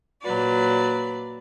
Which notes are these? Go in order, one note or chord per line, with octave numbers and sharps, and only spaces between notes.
A#2 F#3 B4 D5